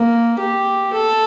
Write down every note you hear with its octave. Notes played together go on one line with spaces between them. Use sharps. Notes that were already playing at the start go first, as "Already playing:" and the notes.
Already playing: A#3
G4
A4